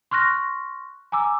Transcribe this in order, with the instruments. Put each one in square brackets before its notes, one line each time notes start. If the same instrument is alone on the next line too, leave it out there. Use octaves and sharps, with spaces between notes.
[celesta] C6 C#6 F6 F#6 A#6
G#5 A#5 D6 E6